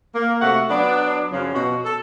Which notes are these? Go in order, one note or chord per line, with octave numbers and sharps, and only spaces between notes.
A#3
C3 A3 F#4 F5 F#5
F#3 B3 D4
F#2 C#3 F3 F#3 C#4
B2 F#4
A4